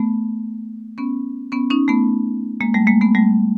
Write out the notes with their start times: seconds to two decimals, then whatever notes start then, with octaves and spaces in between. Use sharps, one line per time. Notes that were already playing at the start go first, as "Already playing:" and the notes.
Already playing: A3 B3
0.98 B3 C#4
1.52 B3 C#4
1.70 C#4 D#4
1.88 A3 B3
2.61 G#3 A#3
2.74 G3 A3
2.87 G#3 A#3
3.01 A3 B3
3.15 G3 A3